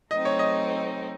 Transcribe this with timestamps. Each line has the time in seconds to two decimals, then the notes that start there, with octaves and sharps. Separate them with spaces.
0.11 F#3 A3 C4 D#4 D#5
0.25 C#5
0.39 D#5